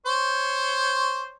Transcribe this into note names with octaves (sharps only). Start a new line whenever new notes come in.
C5 C#5